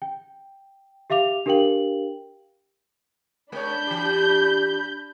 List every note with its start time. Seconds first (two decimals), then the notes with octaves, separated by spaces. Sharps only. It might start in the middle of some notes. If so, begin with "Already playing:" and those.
0.02 G5
1.10 G4 E5 F5 D6 F7
1.46 D4 G4 A#4 F5 G5 F#7
3.52 G#3 D4 C#5 B5 G6
3.87 E3 G4